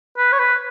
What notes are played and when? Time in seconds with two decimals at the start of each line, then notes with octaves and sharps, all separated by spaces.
0.17 B4
0.33 C#5
0.39 B4